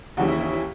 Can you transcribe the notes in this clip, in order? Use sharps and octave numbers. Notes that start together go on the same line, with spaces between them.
D#2 C#3 E3 F#4
E4
E4
E4